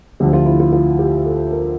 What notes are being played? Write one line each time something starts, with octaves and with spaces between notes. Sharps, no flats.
D2 D3 F3 G4
F4
E4
F4
F4
G4
A4
A#4